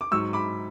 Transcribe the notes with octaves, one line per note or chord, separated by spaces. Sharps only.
D6
G#2 F#3 C#6 E6
B5 D6